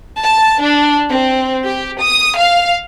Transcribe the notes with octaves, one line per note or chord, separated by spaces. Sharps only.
A5
D4
C4
G4
D#6
F5